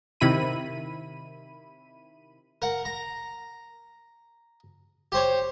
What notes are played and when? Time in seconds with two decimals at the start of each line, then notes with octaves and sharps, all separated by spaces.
0.20 C3 D#3 E4 B5 D#7
2.62 A#4 F#5
2.85 A#5
5.12 G4 C5 C#5